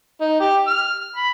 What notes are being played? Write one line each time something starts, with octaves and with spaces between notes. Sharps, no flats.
D#4
G4
F6
B5